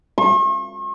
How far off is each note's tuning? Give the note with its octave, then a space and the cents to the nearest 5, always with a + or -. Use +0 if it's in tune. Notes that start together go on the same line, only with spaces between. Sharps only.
C#6 -45